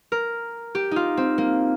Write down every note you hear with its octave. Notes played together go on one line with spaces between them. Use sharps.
A#4
G4
D#4 F4
C4
A#3